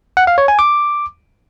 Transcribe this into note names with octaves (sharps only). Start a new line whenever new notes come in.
F#5
F5
C#5
G#5
D6